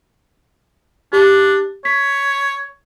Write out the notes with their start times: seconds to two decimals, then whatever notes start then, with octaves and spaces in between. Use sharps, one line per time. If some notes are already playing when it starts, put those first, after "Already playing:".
1.13 D4 G4
1.85 C#5 B6